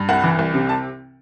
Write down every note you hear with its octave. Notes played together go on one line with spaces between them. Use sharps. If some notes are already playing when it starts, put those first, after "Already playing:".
Already playing: G2
C2 F#5
E3
C2
C3
A5